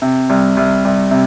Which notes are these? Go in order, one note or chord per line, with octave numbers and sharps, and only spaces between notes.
C3
C2
C2
C2
C3